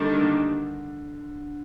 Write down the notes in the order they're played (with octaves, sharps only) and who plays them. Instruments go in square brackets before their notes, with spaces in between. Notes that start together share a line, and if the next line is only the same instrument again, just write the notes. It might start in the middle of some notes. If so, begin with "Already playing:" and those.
Already playing: [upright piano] D3 [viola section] D#3 G3 A#3 D4 A4
[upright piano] D3